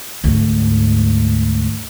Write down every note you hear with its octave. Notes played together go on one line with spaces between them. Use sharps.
D2 G#2